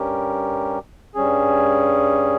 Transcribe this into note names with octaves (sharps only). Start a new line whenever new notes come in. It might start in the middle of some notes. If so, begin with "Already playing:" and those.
Already playing: G2 G3 C#4 G4 A#4
G2 G3 C#4 G#4